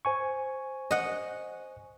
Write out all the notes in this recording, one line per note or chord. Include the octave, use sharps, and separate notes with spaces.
C5 G#5 C#6
D#5 F#5